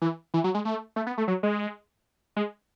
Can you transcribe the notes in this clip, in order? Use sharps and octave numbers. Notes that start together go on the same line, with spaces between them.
E3
E3
F#3
G#3
A3
A3
B3
A3
F#3
G#3
G#3